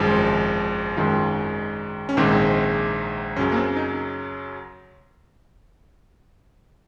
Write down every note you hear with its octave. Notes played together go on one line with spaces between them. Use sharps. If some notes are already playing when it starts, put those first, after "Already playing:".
Already playing: G#1 F#2 F3 G#3
G#1 F#2 D#3 G#3 F4
C#4
A#1 G#2 D#3 G#3 C4
F#2 C#3 F#3 C#4
A#3
C4
D#4